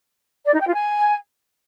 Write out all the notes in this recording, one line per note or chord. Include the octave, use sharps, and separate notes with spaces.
D5
D#4
G5
F4
G#5